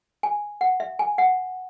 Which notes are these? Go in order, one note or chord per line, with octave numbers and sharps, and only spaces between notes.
G#5
F#5
E5
G#5
F#5